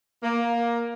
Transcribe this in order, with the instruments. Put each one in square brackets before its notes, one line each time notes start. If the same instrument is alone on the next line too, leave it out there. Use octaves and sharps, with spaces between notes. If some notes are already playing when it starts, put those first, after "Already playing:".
[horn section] A#3